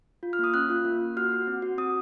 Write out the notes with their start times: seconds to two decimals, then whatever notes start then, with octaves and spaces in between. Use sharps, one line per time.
0.23 F4
0.33 F6
0.39 A#3 D#6
0.54 C#4 F#6
0.70 F4
0.85 A#3
1.00 A#3
1.17 F#4 F6
1.32 F#4
1.47 C4
1.62 F#4
1.78 C4 D#6